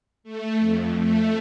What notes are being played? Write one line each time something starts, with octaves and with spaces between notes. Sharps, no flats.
A3
F2
A3